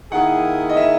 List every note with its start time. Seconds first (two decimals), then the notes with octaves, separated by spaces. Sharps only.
0.11 D#3 A#3 E4 G#4 F#5
0.70 D#5
0.77 E5